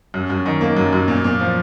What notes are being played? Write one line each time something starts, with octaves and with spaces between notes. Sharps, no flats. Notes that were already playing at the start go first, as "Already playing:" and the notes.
F#2
F#2
D#3
A#3
F#2
F#2
A#2
A#2
F3